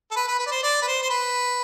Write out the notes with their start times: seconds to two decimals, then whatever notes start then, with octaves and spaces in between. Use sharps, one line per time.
0.11 A4
0.16 B4
0.28 B4
0.39 B4
0.46 D5
0.51 C5
0.63 D5
0.82 B4
0.87 C5
1.03 C5
1.10 B4